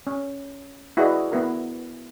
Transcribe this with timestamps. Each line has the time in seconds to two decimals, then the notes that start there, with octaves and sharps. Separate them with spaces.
0.07 C#4
0.97 E4 F#4 G#4 B4 D5 D#5
1.32 B3 E4 A#4